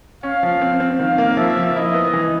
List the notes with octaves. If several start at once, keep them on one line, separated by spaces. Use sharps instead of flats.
C#4 F5
F3
C4
C4
D#3 F5
A#3
F3 E5
F3
E4 D#5
B3
E3